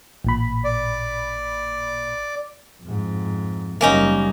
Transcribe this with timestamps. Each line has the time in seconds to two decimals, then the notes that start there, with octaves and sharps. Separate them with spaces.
0.24 A1 A#2 B5
0.64 D5
2.83 F2 G#2
3.81 F#1 G3 A#3 C#4 D#4